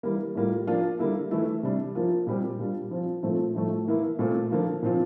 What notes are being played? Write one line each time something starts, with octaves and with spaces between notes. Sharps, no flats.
E3 G3 A#3
A2 G3 A#3 F4
F3 A#3 D4 F4
D3 G3 A#3 E4
E3 A3 E4
C3 G3 D4
F3 A#3 F4
A#2 G3 C4 G4
A#2 G3 D4 F4
F3 C4 F4
A#2 F3 A3 C4 F4
A2 F3 A3
E3 A#3 E4
A#2 A3 C4 F4
D3 F3 A#3 F4
A#2 F3 C4 F4